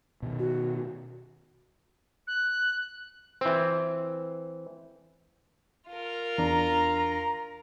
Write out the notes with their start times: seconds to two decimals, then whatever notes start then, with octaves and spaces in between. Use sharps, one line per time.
0.23 B2 D#3
0.39 F#4
2.27 F#6
3.41 E3 C4
5.88 F4 A#4
6.38 E2 D4 A#5